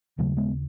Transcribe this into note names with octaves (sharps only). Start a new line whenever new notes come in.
D#2 C#3 F#3 A3
G#3 B3